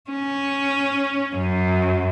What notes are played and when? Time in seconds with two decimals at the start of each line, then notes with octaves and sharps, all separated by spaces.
0.10 C#4
1.36 F#2